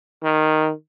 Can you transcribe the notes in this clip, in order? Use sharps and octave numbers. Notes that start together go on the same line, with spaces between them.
D#3